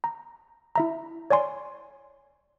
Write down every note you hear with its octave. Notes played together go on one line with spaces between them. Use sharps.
A#5
E4 E5 A#5
C#5 D5 G#5 C6